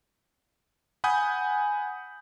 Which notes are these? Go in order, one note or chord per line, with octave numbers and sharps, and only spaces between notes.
F#5 G#5 B5 D#6 G6